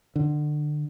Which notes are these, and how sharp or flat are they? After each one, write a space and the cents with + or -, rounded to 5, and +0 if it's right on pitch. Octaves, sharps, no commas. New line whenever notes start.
D3 +25